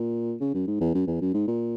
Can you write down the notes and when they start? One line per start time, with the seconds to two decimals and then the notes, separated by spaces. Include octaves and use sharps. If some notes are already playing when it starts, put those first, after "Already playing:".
Already playing: A#2
0.40 C#3
0.54 F#2
0.67 G#2
0.81 E2
0.94 F#2
1.07 E2
1.21 F#2
1.34 G#2
1.47 A#2